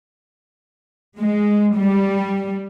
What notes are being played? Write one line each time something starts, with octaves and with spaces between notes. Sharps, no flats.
G#3
G3